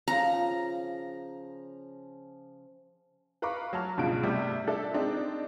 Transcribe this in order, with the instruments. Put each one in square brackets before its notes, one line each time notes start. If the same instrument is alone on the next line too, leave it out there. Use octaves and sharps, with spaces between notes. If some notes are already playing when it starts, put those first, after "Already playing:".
[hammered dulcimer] C#3 F3 [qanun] A#5
[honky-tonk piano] B4 F5 A#5 B5 C#6 D6
F#3 A5 F6
C#2 G2 B2 F3 F4 D7
A2 C3 G3
D4 A4 D5 E5
G#3 C4 D4 D#4